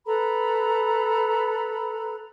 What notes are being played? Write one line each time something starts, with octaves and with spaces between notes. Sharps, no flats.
A4 B4 A#5 B5